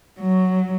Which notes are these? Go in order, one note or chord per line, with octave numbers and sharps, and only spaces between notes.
F#3